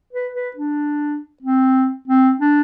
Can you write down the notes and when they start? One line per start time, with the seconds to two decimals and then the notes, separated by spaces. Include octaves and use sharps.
0.13 B4
0.35 B4
0.57 D4
1.43 C4
2.08 C4
2.41 D4